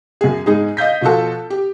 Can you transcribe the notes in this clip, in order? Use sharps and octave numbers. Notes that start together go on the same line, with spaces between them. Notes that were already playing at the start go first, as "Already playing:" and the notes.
F#2 G#4
G#2 G#3 D#4 G#4
D#5 F5 G6 B6
B2 F3 F4 F#4 A4
G4